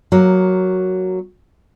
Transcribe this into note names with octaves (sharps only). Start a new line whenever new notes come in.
F#3 A#3